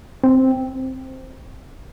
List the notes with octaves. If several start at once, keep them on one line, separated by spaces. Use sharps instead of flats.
C4